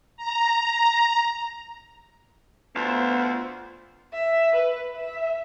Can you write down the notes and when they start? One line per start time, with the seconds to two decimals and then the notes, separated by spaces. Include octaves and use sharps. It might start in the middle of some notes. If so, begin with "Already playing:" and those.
0.17 A#5
2.76 D2 B3 F4 C5 F5
4.13 E5
4.55 B4
4.96 E5